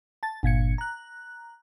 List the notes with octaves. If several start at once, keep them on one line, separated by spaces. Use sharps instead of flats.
A5 A6
G1 A#2 G#6 C#7
A#5 F#6